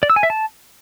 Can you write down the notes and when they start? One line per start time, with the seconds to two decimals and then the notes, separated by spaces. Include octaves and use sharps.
0.03 D5
0.10 E6
0.16 G#5
0.23 E5
0.30 A5